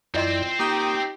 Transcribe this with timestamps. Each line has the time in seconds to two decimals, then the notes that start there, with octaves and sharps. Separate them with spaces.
0.14 F#2 C4 E4 F4 C5 D5 D#5 C6
0.59 A#3 D#4 G4 A#5 D#6